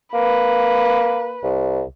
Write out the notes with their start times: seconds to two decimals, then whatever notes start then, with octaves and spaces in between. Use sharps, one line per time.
0.14 A#3 B4
1.43 C2